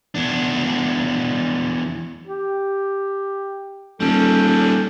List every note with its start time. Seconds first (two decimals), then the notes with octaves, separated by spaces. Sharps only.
0.15 E2 D4
2.27 G4
4.00 D#1 G3 C#4 A4